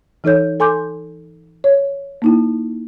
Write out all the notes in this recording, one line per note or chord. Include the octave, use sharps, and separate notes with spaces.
E3 D#4 A4 C#5 G6
A4 G#5 C6 D6 G6
C#5
A#3 D#4 E4